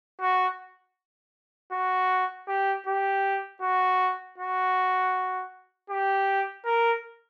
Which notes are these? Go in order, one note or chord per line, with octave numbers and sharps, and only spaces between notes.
F#4
F#4
G4
G4
F#4
F#4
G4
A#4